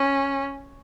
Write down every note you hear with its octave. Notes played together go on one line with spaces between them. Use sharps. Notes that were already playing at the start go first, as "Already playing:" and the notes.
Already playing: C#4